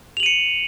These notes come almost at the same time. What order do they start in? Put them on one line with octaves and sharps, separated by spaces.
F7 F#7 D#7 C#7